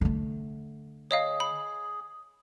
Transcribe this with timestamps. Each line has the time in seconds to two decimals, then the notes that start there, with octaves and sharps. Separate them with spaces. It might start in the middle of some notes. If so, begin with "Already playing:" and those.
0.01 D3 A3
1.11 G#4 C#5 D#5 F5
1.40 B5